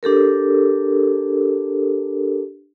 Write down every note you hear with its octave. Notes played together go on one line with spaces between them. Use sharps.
D4 G4 A4 A#4